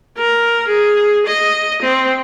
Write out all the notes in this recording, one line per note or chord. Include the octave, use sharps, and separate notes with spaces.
A#4
G#4
D#5
C4